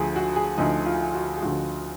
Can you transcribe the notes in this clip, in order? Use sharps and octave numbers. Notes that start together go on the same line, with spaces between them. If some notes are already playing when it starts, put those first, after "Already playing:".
Already playing: D2 D3 F3 G#4
F#4
G#4
D2 D3 F3 D#4
F4
F#4
G#4
D2 D3 F3 F#4